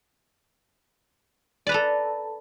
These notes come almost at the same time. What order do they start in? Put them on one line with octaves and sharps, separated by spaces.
D5 B4 A#5 A4